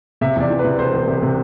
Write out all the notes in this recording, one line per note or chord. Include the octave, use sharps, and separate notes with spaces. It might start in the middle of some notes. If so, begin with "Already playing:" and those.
C3 E5
E2 D5
E3
B4
C3
E1 C5
E1
C3
C3